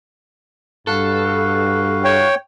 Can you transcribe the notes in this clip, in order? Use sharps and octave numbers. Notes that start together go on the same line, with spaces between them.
G2 F#4 A4 B4 F5
C#5 G5